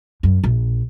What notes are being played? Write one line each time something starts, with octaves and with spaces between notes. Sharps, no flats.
F#2
A#1